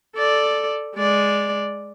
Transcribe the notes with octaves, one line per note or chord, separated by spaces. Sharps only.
A4 D5
G#3 D5